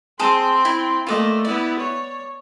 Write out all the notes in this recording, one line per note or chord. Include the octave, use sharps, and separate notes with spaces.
C4 G#4 A5 C6 D#6
E4
A3 A#3 F4 D5 D#5
B3 E4 D5
C#5